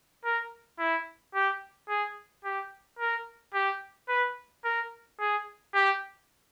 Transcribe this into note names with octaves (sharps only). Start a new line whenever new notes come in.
A#4
E4
G4
G#4
G4
A#4
G4
B4
A#4
G#4
G4